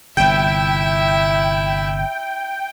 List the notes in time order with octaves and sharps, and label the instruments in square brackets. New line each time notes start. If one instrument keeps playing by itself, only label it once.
[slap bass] G1 C3 [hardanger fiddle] E4 E5 [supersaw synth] G5